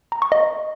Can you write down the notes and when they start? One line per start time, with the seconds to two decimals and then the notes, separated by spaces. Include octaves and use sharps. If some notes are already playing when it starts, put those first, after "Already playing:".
0.12 A#5
0.22 C#6
0.32 D#5